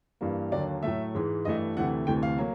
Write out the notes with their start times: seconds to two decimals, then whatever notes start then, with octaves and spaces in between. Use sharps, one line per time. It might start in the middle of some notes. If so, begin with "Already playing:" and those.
0.21 G2 E3 G3 A#3
0.52 D#2 D3 F#3 A#3 D5
0.83 A2 F#3 A3 E5
1.15 G#2 E3 G#3
1.45 G2 E3 A3 D#5
1.77 D2 C3 E3 A3 F#5
2.07 D2 C3 E3 A3 G5
2.23 F5
2.38 F#3 A#3